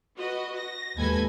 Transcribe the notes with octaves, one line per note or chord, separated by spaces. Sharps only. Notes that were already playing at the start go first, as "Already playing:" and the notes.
F#4 B4 D#5
A#6
D#2 G#2 A4 B4 G#5 G#6